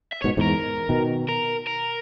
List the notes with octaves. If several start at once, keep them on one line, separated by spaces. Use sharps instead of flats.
E5
G#2 B2 C#5
E2 G#2 A#4
B2 D#3
A#4
A#4